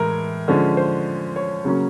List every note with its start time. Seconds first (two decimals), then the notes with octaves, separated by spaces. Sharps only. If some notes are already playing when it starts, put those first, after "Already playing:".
Already playing: A2 E3 G#3 A#4
0.48 D3 F3 G#3 C#4
0.77 C5
1.36 C#5
1.64 C#3 F#3 A#3 C#4